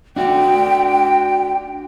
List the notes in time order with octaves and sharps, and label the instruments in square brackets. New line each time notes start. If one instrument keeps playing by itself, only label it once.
[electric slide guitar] D4 F#4 [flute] G5